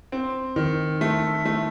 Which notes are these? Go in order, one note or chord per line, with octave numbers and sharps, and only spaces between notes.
C4
D#3
A3
A3